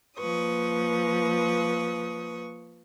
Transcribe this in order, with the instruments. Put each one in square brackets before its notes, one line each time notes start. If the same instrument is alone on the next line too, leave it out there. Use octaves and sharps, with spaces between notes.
[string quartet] F3 A#3 B4 C#6 D#6